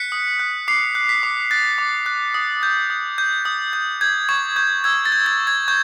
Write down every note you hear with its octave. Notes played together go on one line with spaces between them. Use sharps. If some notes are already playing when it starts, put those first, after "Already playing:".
Already playing: F#6 B6 C#7
D#6
F#6
D6 C7
F#6
B6
D6
F#6 A6
D6
F#6
D#6
G6
D#6
G6
D#6
G6
G6 G#6
C#6 G#6
C#6 G6
E6 G#6
A6
G6
G#6
C#6
G#6
C#6 G6